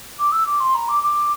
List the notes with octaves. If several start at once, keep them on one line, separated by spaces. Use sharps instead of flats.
D6
E6
D6
C6
A#5
D6
D6